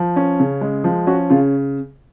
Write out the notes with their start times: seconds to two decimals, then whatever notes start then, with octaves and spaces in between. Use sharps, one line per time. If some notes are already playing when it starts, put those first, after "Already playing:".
Already playing: F3
0.16 C#4
0.40 C#3
0.61 G#3
0.84 F3
1.07 C#4 F#4
1.30 C#3 F4